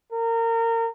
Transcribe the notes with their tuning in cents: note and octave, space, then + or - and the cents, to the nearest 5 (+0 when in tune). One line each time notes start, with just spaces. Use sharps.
A#4 -25